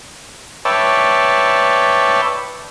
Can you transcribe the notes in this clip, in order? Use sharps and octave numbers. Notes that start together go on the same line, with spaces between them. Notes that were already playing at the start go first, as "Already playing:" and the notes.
B4 C#5 D5 E5 G5 A5